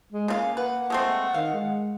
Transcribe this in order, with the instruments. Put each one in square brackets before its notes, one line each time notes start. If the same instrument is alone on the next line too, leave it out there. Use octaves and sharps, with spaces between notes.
[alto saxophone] G#3
[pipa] C#3 F4 F5 [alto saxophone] A#3 [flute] G#5
[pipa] B4 [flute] F#5
[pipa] G#3 A3 C4
[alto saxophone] D#3 [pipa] F5
[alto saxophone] G#3